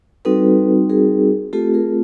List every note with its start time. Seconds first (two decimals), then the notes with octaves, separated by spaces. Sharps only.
0.25 G3 C4 D#4 F#4 A4 B4
0.90 G#4 A#4
1.53 A3 C4 F4 G4 A4
1.74 G#4 A#4